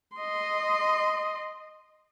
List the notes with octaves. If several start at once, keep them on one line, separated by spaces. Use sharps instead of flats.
D#5 C6